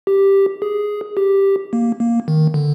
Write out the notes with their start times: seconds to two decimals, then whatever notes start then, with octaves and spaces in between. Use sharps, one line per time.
0.07 G4
0.62 G#4
1.17 G4
1.73 A#3
2.00 A#3
2.28 D#3
2.54 D3